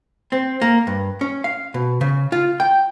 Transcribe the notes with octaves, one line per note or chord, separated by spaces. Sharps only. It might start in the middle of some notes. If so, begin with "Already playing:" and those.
C4
A#3
G2
C#4
F5
B2
C#3
F4
G5